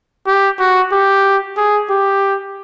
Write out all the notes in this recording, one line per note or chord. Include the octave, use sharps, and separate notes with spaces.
G4
F#4
G4
G#4
G4